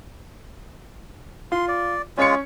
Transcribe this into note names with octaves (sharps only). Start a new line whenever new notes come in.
F4 C6
D5
G#3 C#4 F4 C#5 C#7